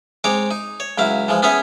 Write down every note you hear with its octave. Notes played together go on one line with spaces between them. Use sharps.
G#3 C4 C#5 A#5 D6
D#4
C#5
C#2 F#3 E4 F5
E3 F3 G#3
B3 C#4 G#4 C#5 E5